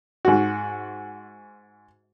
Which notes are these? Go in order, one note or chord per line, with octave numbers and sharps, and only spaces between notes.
G#2 F#4